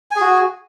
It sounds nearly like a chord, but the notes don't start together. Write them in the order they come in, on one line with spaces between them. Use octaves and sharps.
G#5 G#4 F#4